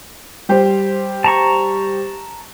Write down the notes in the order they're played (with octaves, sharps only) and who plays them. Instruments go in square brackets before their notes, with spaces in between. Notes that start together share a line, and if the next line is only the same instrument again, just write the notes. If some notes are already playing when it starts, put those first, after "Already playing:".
[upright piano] G3 G4 C5
[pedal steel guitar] A5 A#5 C#6